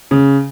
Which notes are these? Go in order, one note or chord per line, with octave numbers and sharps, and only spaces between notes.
C#3